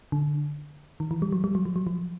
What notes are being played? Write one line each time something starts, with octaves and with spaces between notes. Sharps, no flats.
D3
D#3
E3
G3
F#3
G3
F#3
F3
F#3
F3